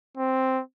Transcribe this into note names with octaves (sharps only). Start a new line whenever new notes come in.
C4